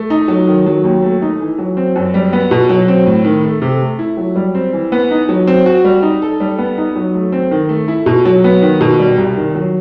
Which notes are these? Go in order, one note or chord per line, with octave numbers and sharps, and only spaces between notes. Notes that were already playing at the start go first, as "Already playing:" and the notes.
Already playing: A3
D#4
F#3
D#3
F#3
D#2
A3
D#4
E3
F#3
C4
F#2
G3
B3
B2
F#3
C4
A2
D#3
A3
C3
A3
E4
F#3
G3
C4
E3
B3
D#4
F#3
C4
F#4
G3
D#4
A4
G3
B3
D#4
F#3
A3
C4
D#3
A3
E4
B2
F#3
B3
D#3
B2
G3
C2
D#3
F#3